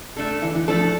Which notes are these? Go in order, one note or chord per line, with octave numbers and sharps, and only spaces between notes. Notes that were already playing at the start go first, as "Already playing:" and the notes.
A3 D4 A4
D3 E3
E3
F3 A3 D4 A4